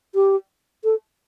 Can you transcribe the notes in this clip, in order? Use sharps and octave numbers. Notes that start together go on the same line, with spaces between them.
G4
A4